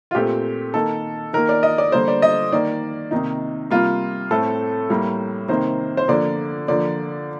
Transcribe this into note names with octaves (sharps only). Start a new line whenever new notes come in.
F4
A#2 A3 C4 G4
D#3 A#3 A4
D#3 A#3 A#4
D5
D#5
D5
D3 G3 A#3 C5
D5
D#5
D#3 A#3 D5
C3 D#3 A#3 D#4
C3 G3 A#3 F4
A2 A3 C4 A4
A2 G3 A#3
C3 D#3 A#3 C5
C5
D3 F3 A#3 D5
D3 F3 A#3 D5